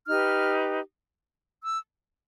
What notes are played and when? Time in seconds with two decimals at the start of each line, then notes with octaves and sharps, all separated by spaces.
0.07 D#4 G4 B4 F6
1.63 E6